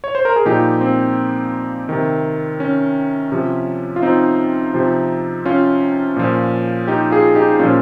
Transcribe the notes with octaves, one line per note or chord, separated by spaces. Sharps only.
C#5
C5
A#4
G#4
A#2 F3 D#4 G4
C4
C3 D#3
C#4
C3 F3
F4
C4 D#4
C3 F3
C#4 F4
A#2 F3
D#4 G4
F4 G#4
D#4 G4
A#2 F3 C#4 F4